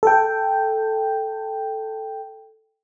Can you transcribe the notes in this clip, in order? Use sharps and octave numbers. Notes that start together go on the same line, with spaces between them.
A4 G5